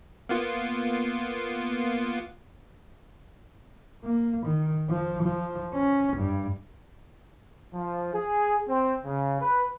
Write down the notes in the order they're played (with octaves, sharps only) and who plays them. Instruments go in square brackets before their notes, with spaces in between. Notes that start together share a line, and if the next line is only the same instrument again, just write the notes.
[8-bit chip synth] A#3 B3 F4
[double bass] A#3
D#3
F3
F3
C#4
G2
[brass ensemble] F3
G#4
C4
C#3
B4